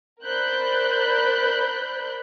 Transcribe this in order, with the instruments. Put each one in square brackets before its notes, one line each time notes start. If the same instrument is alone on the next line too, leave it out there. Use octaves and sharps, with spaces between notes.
[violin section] A#4 C5 D5 B5 F#6 G6